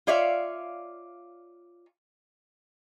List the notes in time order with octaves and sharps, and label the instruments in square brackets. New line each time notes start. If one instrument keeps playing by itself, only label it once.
[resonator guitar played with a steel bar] F4 C#5 D5 E5 F5